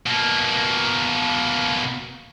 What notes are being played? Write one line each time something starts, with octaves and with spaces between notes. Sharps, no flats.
B2 A#3